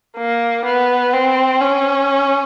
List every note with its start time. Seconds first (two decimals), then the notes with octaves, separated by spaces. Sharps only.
0.18 A#3
0.65 B3
1.13 C4
1.61 C#4